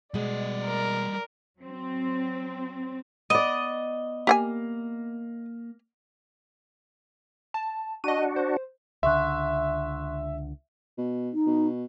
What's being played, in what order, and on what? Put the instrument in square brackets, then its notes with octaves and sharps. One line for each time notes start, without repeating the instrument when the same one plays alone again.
[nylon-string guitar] B2 G#3 [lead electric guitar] G3 D#5 [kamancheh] D5
[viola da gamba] A#4
[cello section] F#3 C4
[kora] B3 D5 [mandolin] D#5
[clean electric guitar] A#3 [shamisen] G4 F#5 G#5
[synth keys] A5
[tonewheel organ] D4 F#4 [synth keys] D#5 D#7
[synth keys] C5
[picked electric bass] C#2 D3 [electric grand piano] E5 [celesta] C6 C#6 F#6
[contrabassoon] B2
[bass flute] D#4
[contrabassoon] B2